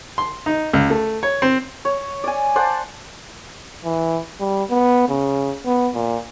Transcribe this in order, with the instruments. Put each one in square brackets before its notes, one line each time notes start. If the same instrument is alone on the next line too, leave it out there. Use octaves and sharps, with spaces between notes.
[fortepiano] C6
D#4
C#2
A3
C#5
C4
[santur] C#5
D5 G#5
C5 D5 F#5 A5
[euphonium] E3
G3
B3
C#3
B3
A#2